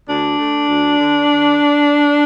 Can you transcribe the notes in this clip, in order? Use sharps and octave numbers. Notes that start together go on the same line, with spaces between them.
D2 D4
A3
D2
D3
D3